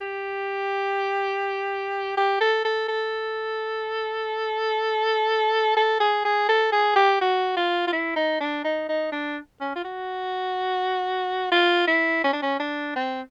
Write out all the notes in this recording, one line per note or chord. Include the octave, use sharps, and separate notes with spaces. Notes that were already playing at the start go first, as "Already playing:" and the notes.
G4
G4
A4
A4
A4
A4
G#4
G#4
A4
G#4
G4
F#4
F4
F4
E4
D#4
D4
D#4
D#4
D4
C#4
F4
F#4
F4
E4
C#4
D4
C#4
D4
C4